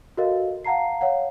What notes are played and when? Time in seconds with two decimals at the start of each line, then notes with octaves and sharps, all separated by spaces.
0.17 F#4 A4 A#4 D#5 F5
0.65 F5 F#5 A5 A#5 C7
1.01 C#5 F5 F#5